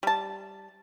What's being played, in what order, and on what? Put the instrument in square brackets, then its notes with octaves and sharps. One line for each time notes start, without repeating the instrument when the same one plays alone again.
[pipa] G3 A5